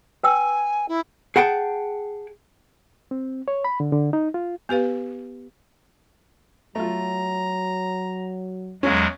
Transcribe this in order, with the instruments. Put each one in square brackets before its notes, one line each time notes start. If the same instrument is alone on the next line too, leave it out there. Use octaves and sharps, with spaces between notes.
[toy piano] B4 G5 E6 [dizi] G#5
[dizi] E4
[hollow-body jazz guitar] G#4 F#5 G5 A5
[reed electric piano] C4
C#5
B5
D3
D3
D#4
F4
[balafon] B3 G4 B4 F5
[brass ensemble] F#3 [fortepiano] A3 F4 [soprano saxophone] A#5
[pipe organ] E2 F#3 G#3 [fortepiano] C#4 F5